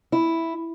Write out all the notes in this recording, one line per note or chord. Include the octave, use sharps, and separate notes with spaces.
E4